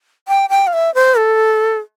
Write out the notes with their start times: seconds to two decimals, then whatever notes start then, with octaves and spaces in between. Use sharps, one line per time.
0.28 G5
0.50 G5
0.67 F5
0.73 E5
0.95 C5
1.18 A4